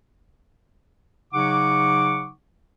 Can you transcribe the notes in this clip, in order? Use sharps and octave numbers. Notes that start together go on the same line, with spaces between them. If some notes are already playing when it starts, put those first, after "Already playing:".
C#3 F#3 D#4 F#5 C#6 D6